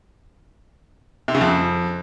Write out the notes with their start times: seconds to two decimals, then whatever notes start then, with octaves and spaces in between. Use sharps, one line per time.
1.28 C3
1.35 C#3
1.41 F2